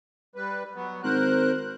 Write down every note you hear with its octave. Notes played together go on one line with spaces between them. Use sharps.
G3 B4
F#3 B3
G#1 A#4 C5 F#6